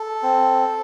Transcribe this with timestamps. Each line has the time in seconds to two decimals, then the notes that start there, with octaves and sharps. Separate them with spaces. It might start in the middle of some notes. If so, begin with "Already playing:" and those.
Already playing: A4
0.23 C4